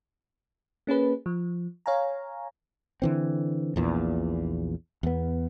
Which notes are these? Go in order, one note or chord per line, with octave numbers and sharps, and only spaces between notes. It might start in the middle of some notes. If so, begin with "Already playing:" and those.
A#3 C#4 G#4 B4
F3
C#5 F5 G#5 A#5
D3 E3 C4
A#1 E2 A#2
E2 B3